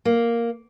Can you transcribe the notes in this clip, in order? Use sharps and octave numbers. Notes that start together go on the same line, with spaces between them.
A#3